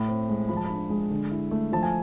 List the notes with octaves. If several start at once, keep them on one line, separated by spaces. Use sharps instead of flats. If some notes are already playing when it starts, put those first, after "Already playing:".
Already playing: A2
C4
G#3
F3 B5
A5
D4 B5
G#3
D3
E4
A3
F3 A5
G#5